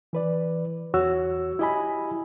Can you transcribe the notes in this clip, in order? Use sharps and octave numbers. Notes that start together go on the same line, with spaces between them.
E3 B4 D5
E2 F#4 C#5 E6
E4 G4 D#5 G#5 B5